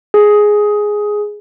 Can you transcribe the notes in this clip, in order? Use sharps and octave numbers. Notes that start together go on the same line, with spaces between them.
G#4